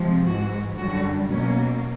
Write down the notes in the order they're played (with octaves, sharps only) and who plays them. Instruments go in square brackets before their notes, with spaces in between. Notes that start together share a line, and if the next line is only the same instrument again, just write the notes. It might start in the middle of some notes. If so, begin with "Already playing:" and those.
Already playing: [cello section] C3 F3 G#3
G#2 E3 G#3 F#4
F#2 D3 G3 F#4
B2 F#3 A#3 C#4